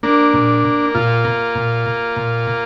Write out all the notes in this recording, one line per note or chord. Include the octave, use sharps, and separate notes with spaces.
A#3 D4
A#2
A#3
A#2 F4
A#3
A#2
A#3
A#2
A#3